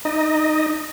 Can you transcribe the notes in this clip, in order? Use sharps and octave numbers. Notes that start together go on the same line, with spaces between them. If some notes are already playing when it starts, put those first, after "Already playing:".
D#4 D#5